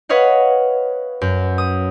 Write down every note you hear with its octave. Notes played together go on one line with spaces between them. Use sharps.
B4 C#5 D#5 F5 F#5
F#2
D#6